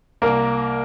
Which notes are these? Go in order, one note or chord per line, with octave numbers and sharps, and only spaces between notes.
C2 A#3 A#4